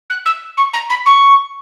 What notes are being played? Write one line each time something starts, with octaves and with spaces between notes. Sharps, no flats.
F#6
E6
C#6
A#5
B5
C#6